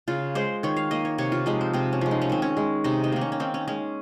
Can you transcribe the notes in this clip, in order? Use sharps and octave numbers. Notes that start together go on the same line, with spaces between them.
C#3 F4
G#3 C5
D#3 C#5
F5
A#3 D#5
C#5
C3 C#5
F4
F3 G#3 D#4
C4
C3 C4
C#4
F3 G#3
D#4
C#4
D#3 C4
C#4
G#3
C3 D#4
D#4
D#3 A#3
C#4
C#4
D#3 C4
C#4
G#3 C#4